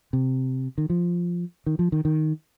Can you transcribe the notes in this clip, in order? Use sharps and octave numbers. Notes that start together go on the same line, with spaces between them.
C3
D#3
F3
D#3
F3
D#3
D#3